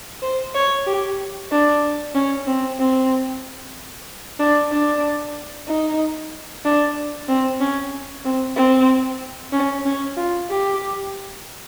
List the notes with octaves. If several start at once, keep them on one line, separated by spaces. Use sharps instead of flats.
C5
C#5
G4
D4
C#4
C4
C4
D4
D4
D#4
D4
C4
C#4
C4
C4
C#4
C#4
F4
G4